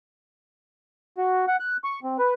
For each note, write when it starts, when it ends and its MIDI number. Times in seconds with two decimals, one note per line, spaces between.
1.18 1.45 66
1.48 1.56 78
1.60 1.77 90
1.84 2.00 85
2.04 2.17 60
2.19 2.34 71